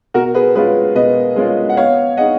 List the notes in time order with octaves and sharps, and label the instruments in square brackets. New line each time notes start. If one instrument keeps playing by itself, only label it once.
[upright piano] B2 [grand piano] F#4 A#4
[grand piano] G#4 B4
[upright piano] G#3 C#4 F4 [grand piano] G#4 B4
[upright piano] B2 [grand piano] B4 D#5
[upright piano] G#3 C#4 F4
[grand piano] F#5
[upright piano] B3 [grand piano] C#5 F5
[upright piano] D#4 G#4 [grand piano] D#5 F#5